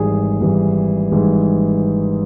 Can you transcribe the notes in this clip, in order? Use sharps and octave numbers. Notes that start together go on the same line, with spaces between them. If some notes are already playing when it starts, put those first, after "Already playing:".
Already playing: G#1 G#2 E3 G3 G#4
G#1 G#2 E3 G3
G#1 G#2 E3 G3